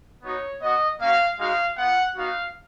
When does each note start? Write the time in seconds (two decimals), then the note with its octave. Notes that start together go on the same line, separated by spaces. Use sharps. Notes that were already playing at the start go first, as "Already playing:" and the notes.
0.23 B3 D#4 F#4 C#5
0.62 B3 F#4 D#5
1.00 A#3 C#4 F#4 F5
1.39 G#3 D#4 F#4 F5
1.77 B3 F4 F#5
2.16 B3 D#4 F#4 F5